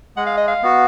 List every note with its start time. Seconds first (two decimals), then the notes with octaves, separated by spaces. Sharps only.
0.17 G#3 F#5
0.26 F5
0.37 D#5
0.48 F5
0.62 B3 F#4